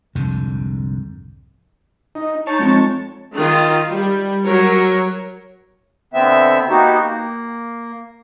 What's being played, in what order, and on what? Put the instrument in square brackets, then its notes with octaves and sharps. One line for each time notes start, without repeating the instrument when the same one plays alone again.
[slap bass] C2 F2 G#2 D3
[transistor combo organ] D#4
[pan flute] D#4 [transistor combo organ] C#5 A5
[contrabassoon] F2 [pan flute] G#3
[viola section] D#3 F4
G3
F#3 A#4 C#5
[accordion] B2 D3 B3 C4 E5
A#3 B3 D#4 F#4 G4
A#3